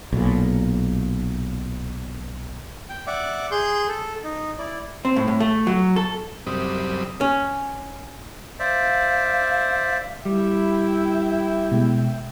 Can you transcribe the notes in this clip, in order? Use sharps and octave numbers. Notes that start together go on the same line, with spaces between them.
B1 A#2
G5
D5 E5 F#5 D6
G#4 C6 G6
A4
D#4
E4 D5
C4
A2
A2
A3
F#3
A4
F#2 C3 G3 C4 B5 D#6
C#4
C5 D5 E5 F5
G3 E4 E5 G5
B2 G#3